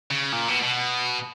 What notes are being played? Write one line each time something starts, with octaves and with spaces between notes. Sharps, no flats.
C#3
A#2
B2
B2